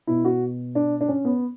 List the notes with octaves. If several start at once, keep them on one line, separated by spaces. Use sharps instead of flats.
B2 E4
F#4
D4
D4
C#4
B3